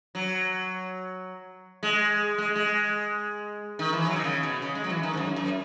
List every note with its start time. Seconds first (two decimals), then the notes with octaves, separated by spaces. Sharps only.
0.15 F#3
1.83 G#3
2.38 G#3
2.56 G#3
3.79 D#3
3.93 E3
4.07 F#3
4.16 D#3
4.24 C#3
4.43 B2
4.62 C#3
4.75 G#3
4.84 F#3
4.90 E3
5.03 D#3
5.13 G#2
5.17 F#2
5.36 F#2